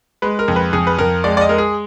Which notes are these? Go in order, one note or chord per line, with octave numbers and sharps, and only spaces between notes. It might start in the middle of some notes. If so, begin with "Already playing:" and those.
G#3 B4
A#4
F2
B4
F2 G#4
B4
F2 A#4
G#3 D5
D5
D#5
G#3 A#4
G#4